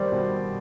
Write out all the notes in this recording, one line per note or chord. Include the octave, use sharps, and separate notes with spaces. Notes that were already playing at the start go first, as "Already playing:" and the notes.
Already playing: D#3 G3 C5 D5
B2